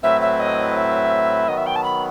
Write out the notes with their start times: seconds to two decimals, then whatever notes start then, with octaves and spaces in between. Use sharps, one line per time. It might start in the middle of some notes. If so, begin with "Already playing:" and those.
0.03 A2 F#3 C4 E4 B4 E5
0.21 E5
0.39 D#5
0.76 E5
1.47 D#3 F#3 B3 D#5
1.57 E5
1.66 G5
1.75 A5
1.83 B5